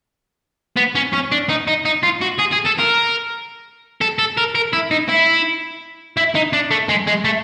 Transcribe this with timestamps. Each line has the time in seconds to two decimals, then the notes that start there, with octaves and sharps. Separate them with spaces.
0.77 B3
0.95 C#4
1.13 C#4
1.32 D4
1.49 D#4
1.68 D#4
1.85 D#4
2.03 F4
2.21 F#4
2.39 G#4
2.52 G#4
2.66 A4
2.79 A#4
4.01 A4
4.19 A4
4.37 A#4
4.55 A#4
4.73 E4
4.91 D#4
5.09 E4
6.17 E4
6.35 D#4
6.53 D4
6.71 A3
6.89 G#3
7.07 G#3
7.24 A3